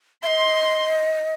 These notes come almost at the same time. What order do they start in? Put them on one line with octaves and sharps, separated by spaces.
E5 C6 D#5